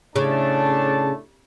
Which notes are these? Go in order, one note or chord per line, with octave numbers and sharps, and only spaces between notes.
A2 C#3 A3 D4 A5